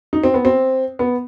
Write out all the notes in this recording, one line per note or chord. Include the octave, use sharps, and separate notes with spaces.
D#4
C4
B3
C4
B3